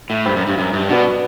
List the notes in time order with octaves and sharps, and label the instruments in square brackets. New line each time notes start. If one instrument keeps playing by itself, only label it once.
[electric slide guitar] A2
[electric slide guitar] G2 [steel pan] C5 G5 B5
[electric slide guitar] F#2
G2
F#2
G2
[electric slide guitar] B2 [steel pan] D4 F#4 B4 F#5